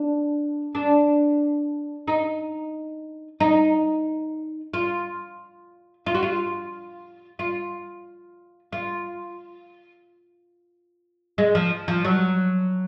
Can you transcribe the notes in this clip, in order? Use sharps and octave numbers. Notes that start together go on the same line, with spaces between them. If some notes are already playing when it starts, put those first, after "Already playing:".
Already playing: D4
D4
D#4
D#4
F4
F4
F#4
F4
F4
F4
G#3
F3
F3
F#3